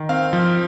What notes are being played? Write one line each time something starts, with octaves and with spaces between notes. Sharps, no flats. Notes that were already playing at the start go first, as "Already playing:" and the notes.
Already playing: D#3
C4 F5
F3